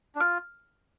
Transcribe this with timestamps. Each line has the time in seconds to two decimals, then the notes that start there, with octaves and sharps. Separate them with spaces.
0.15 D4
0.20 F4 F6